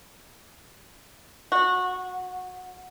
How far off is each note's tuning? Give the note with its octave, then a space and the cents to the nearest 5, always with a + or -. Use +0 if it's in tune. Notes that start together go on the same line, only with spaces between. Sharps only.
F#4 -20